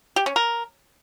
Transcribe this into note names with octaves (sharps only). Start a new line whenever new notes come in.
G4
C#4
A#4